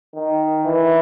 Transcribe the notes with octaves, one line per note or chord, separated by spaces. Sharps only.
D#3
E3